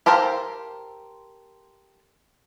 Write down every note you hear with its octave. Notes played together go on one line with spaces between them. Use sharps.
G4 A4 A#4 C5 F5